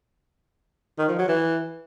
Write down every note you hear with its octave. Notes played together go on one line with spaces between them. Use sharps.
D#3
F3
F#3
E3